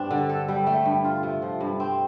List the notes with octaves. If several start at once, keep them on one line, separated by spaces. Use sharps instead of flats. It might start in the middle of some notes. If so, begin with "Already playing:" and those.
Already playing: G2 C4 D4
D3
A4
G3
A3
G2
F4
C3
F3
G2
C4